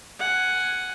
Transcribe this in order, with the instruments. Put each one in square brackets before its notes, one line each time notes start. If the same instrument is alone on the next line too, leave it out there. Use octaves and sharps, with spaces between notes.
[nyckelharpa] F#5 G#5